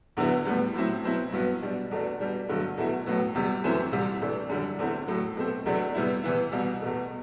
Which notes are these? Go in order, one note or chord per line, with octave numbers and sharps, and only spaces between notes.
E2 D3 F#3 B3 E4
A2 G3 B3
A2 F#3 C4 E4
B2 F#3 C4 E4
G2 F#3 B3
B2 G3 D4
E2 B2 A3 D4
B2 G3 D4
G2 D3 F#3 A3
E2 B2 A3 E4
A2 F#3 B3
E2 C3 G3
F#2 E3 A3 C4 E4
C2 C3 G3
C3 E3 A3 D4
F#2 D3 G3 D4
E2 D3 A3 C4 E4
A2 F#3 A3
B2 A3 C4
E2 C3 F#3 A3 D4
C3 G3 B3 E4
C3 E3 B3 E4
C2 B2 G3
E2 B2 A3